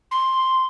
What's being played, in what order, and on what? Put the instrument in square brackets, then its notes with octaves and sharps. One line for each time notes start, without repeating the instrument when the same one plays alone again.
[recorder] C6